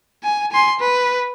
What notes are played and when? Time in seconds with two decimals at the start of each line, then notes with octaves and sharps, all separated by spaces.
0.23 G#5
0.52 G#5 C6
0.80 B4